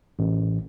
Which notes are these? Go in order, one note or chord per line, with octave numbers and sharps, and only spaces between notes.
A1